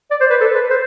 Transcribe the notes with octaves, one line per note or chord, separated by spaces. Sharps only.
D5
C5
B4
A4
B4
C5